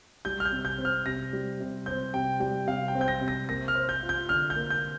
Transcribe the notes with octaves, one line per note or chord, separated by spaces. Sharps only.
G3 G6
F6
G6
C3
G6
C4
F6
C3 A#6
G3
C3
C4 G6
C3 G5
G3 G5
C3 F5
G5
C4
G6
A#6
C3
A#6
A#3 A#6
F6
C5
G6
F4
G6
D3 F6
G6
A#3
G6